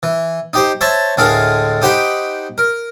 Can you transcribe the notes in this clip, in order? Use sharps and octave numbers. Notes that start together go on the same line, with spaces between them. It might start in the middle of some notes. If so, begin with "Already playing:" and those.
E3
D#4 G4 C5
C5 C#5 E5 A5 C#6
D2 A2 G#3 A4 A#4 F5
D#4 G4 C5 F#5 G5 B5
A#4